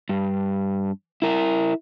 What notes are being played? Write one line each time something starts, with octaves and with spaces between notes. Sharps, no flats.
G2
E4 A#4